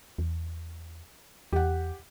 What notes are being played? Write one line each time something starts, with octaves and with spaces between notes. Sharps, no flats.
E2
E2 G4 F#5